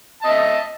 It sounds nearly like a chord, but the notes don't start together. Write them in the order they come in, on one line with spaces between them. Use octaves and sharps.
A5 D#5 E5